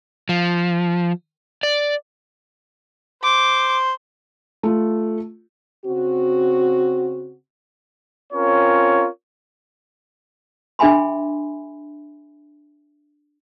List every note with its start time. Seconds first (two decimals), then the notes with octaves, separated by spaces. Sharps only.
0.29 F3
1.63 D5
3.24 C5 D6
4.63 A3 F4
5.86 C#3 C4 F#4
8.33 C4 C#4 F4 A#4 C#5
10.79 D4 G#4 E5 G#5 B5 C6